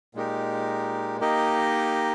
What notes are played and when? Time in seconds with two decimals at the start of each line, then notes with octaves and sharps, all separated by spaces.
0.15 A#2 G#3 D#4 G4 A#4
1.20 A#3 D#4 G4 A#4 D#5